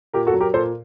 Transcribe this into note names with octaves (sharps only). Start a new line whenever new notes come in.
A#2 G4 A#4
F#4 A4
F#3
G4 A#4
A#2 A4 C5